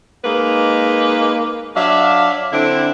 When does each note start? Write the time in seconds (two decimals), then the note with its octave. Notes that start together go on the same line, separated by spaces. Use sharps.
0.25 G#3 A#3 D#4 B4
1.76 F#3 D4 E5 F5
2.53 D3 C4 D4 E4